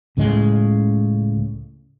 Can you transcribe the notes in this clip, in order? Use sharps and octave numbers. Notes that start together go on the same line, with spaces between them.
C#2 A2 C#3 G#3